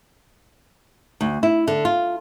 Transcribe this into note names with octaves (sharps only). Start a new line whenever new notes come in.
D2
E4
D3
F4